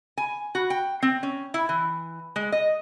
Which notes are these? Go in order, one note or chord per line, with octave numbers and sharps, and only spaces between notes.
G#5
F#4
G5
C4
C#4
E4
E3
G#3
D#5